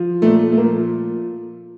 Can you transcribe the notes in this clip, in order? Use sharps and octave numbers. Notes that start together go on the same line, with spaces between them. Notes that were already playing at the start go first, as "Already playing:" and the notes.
Already playing: F3
A#2 A3
A3
F3 A#3